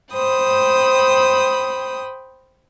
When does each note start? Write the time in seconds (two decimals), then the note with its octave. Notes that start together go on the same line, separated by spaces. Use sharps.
0.14 C5 G5 B5 D#6